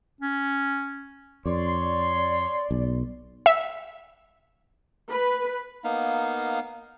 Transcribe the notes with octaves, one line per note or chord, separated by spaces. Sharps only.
C#4
F2 C#5 D5 C6
B1
E5
B4
A#3 B3 D#4 F5